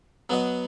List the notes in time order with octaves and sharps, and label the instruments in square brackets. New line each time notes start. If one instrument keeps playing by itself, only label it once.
[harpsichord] F#3 B3 F#4 D#5